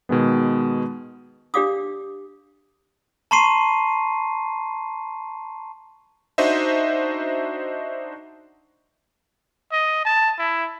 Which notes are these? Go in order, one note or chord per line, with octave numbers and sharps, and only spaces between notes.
B2 D#3 G#3 B3
D4 G4 D5 F5 D6 D#6
A5 A#5 C6 C#6 C7 D#7
D4 D#4 F#4 C5 D#5 E5
D#5
A5
E4